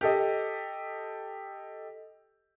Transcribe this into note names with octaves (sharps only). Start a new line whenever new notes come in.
G4 A4 D#5